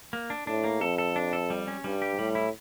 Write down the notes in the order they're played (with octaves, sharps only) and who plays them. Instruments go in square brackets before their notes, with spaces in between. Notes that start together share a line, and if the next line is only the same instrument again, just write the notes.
[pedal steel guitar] A#3
D4
[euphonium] A2 [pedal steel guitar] D4
[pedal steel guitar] A#3
[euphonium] F2 [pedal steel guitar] A4
[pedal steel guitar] A4
D4
A4
G3
C#4
[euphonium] G2 [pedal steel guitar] G3
[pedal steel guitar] G4
[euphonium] A2 [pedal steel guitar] G3
[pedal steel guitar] E4